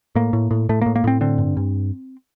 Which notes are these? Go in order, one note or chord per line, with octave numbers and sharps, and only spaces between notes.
A2 A#3
A2
A2
A2 A3
A2 A#3
A#3
A2 C4
D3 C4
G2
G2